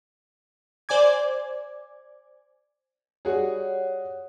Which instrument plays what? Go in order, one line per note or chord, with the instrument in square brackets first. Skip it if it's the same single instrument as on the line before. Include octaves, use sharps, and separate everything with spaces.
[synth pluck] C5 D5 G#5 D6 G#6
[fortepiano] G3 F#4 G#4 [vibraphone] C#5 F#5